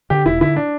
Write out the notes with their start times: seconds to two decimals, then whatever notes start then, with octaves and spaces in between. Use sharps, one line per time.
0.10 D3 G4
0.26 E1 E4
0.41 D3 E4
0.56 D4